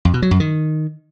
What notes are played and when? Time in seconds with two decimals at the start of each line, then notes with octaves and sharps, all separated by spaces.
0.05 F2
0.14 B2
0.22 F#3
0.31 F#2
0.40 D#3